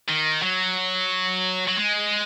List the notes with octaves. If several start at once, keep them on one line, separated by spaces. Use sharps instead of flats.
D#3
F#3
F#3
G#3